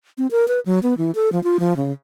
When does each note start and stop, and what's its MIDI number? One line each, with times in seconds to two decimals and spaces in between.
0.18 0.27 60
0.31 0.48 70
0.48 0.60 71
0.66 0.79 54
0.83 0.97 59
0.98 1.11 52
1.15 1.31 69
1.32 1.42 53
1.44 1.57 65
1.60 1.76 53
1.77 1.92 49